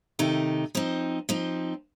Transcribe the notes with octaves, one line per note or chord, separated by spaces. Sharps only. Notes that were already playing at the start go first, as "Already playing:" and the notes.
C3 D#3 A3 D#4
F3 C4 D#4
F3 C4 D#4